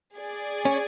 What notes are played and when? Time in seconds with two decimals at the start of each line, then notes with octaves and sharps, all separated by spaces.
0.15 G#4 D5 G#5
0.65 C#4